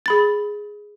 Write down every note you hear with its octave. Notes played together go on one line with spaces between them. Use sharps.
G#4 B5 A6